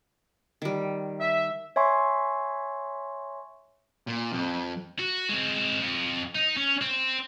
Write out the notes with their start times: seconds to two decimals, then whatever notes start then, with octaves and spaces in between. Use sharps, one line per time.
0.62 D#3 G3
1.20 E5
1.76 C#5 E5 G#5 C6 C#6
4.07 A#2
4.33 F2
4.99 F#4
5.29 G#3 C4
5.81 F2
6.35 D#4
6.57 C#4
6.81 C4